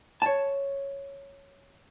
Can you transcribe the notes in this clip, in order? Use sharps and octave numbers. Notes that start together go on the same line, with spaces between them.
C#5 A5